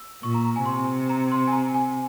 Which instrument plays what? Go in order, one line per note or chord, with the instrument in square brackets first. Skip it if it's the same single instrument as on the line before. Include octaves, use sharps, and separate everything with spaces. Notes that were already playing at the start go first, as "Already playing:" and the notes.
Already playing: [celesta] E6
[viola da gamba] A#2 [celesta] C#6
[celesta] A#5
A#5
G#5
[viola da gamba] C3 [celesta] C6
[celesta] A#5
C6
G#5
A#5
G#5